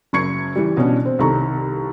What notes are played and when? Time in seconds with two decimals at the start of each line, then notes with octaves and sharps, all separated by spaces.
0.13 F#1 F#2 C#6 G#6 C#7
0.56 E3 G3
0.77 B2 C#4 D4
1.05 C4
1.19 C2 D#3 A4 A#5 C#6